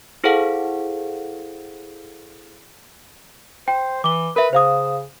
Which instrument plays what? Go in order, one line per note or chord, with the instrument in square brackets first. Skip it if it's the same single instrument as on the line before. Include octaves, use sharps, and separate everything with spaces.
[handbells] E4 G#4 A4 C5 F5 F#5
[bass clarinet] C5 [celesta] G5
[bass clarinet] E3 [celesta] D6 G7
[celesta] A#4 E5 [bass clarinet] B4
[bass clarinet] C#3 [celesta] C5 F5 D#6